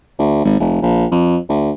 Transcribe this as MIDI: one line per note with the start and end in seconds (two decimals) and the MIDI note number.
0.19 0.44 38
0.45 0.59 32
0.60 0.78 29
0.82 1.05 34
1.11 1.37 41
1.49 1.71 38